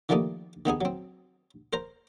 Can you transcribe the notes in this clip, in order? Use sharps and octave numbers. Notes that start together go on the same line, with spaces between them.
D#3 F3 G3 A3 A#3 D#4
D#3 B3 D#4 G#4
F#3 C4
A#4 C5 A#5